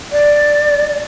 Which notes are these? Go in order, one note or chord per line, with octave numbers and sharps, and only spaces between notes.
D5